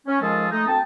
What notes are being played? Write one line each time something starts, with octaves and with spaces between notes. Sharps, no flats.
C#4
D#3 F3 G#3 F4 G#4 A4
A3 D#4
D2 C4 G5 A5